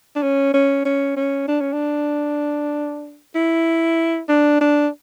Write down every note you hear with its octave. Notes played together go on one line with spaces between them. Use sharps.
D4
C#4
C#4
C#4
C#4
D4
C#4
D4
E4
D4
D4